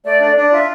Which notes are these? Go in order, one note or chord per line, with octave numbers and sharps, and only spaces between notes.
A3 D5
D4
D4 D5
F4 E5